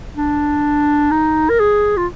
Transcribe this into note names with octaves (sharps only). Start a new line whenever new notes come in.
D4
D#4
A#4
G#4
F4